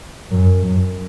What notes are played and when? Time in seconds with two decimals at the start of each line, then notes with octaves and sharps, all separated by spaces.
0.31 F#2
0.62 F#2